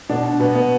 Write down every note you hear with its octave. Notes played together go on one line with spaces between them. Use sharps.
B2 D4
B2 B3
B3